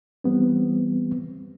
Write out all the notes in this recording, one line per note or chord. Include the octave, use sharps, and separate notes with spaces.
E3 G3 B3 C4